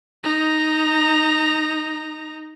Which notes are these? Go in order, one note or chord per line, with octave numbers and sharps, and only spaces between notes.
D#4 A#5